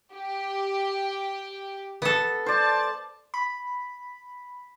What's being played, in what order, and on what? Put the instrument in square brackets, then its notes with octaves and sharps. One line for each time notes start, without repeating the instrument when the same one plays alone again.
[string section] G4
[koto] B3 A4
[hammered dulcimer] C5 D5 [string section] A5
[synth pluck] B5